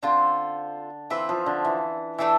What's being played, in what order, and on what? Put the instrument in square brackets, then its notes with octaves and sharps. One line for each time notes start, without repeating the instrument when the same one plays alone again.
[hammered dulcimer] D3 [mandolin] C4 F4 A4 C5
[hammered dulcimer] E3 [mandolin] C4 F4 B4 E5
[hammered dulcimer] F3
D3
E3
[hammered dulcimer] E3 [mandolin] A3 D4 A4 E5